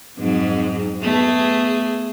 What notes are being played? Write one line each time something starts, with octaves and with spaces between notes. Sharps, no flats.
F2 G#2 F#3
A3 B3 G#4